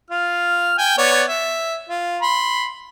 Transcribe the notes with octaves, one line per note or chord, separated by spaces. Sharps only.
F4 F6
G5 G#5
B3 C#5 D5
E5
F4
B5 C6